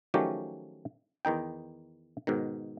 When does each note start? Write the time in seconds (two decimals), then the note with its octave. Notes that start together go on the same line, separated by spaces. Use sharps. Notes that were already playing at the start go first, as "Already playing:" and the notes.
0.14 D#3 F3 F#3 A3 C#4 G4
1.25 E2 D#3 D#4 G5
2.27 G#2 B2 D#3